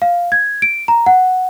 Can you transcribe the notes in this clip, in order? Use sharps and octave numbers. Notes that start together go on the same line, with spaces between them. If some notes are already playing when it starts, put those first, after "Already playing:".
F5
G#6
D7
A#5
F#5